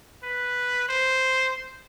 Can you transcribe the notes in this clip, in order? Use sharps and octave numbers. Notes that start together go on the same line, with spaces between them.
B4
C5